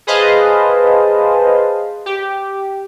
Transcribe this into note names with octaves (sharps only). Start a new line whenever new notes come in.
G#4 B4 C5 D#5 F5 A5
G4